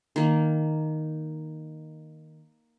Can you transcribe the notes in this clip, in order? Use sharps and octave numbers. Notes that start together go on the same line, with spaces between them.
D#3 A#3